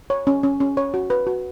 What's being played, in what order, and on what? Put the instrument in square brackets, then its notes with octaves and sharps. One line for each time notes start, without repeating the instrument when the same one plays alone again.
[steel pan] C#5
C#4
C#4
C#4
C#5
F#4
B4
F#4